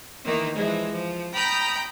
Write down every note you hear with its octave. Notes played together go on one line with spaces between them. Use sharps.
D#3 E3 A#3 D#4
E3 F3 G#3
F3
G5 A#5 B5 D#6 F6 G6